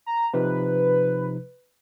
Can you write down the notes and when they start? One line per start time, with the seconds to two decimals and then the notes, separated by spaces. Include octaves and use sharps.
0.06 A#5
0.34 C3 F3 D#4 B4